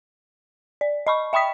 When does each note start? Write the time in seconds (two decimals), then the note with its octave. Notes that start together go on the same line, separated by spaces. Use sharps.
0.81 D5
1.07 D#5 B5 C#6
1.33 E5 G5 B5 D#6 B6